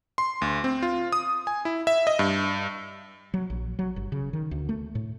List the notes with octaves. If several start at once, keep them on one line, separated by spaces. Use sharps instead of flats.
C6
D2
C4
F4
D#6
G#5
E4
E5
D#5
G2
F#3
A#1
F#3
G1
C#3
D#3
D2
A3
A2